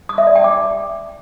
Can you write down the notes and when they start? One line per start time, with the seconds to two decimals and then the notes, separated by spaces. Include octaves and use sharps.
0.09 D#6
0.18 E5
0.27 D5
0.35 G5
0.44 D6